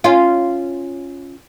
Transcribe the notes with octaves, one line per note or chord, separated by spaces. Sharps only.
C#4 F4